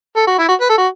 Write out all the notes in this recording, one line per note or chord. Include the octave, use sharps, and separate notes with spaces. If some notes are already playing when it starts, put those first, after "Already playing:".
A4
F#4
E4
F#4
B4
A4
F#4